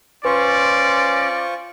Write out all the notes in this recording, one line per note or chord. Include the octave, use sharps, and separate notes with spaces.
C#4 F4 B4 C5 D5 C#6